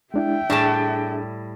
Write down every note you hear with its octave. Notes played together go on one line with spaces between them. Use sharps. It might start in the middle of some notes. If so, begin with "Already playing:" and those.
G#3 D4 E4 E5 G5
A2 G3 D4 G#4 A5